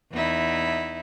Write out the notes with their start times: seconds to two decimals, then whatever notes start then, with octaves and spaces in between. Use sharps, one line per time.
0.12 E2 D#4 E4